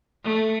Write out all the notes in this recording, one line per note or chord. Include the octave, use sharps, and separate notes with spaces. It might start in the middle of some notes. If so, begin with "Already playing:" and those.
A3